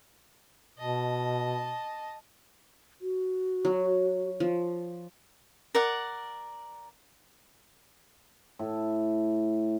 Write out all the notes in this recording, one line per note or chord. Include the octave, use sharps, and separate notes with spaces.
B2 D#5 A5
F#4
F#3
F3
A#4 D5 F#5
A2